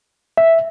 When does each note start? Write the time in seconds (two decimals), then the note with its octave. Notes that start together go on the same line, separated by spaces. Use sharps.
0.37 E5